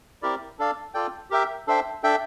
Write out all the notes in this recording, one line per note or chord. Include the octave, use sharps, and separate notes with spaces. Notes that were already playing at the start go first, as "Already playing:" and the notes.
C4 E4 G4 A#4 D5
D4 A4 D5 F5
F4 A4 D5 G5
G4 A#4 E5 G5
D4 A4 C5 E5 G5
D4 A4 E5 G5